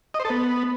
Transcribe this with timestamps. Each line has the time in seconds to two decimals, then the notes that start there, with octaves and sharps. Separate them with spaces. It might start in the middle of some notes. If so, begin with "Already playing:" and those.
0.14 D#5
0.20 C5
0.25 A4
0.30 B3